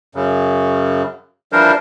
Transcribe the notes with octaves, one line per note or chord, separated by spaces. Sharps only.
F#2 C#3
E3 F3 G3 D4 A#4 C5